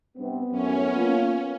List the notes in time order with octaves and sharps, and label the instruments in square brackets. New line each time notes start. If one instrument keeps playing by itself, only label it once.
[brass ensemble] G2 C3 C4 [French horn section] B3
[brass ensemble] F#2 A2 [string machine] C#4
[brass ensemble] A#3 F4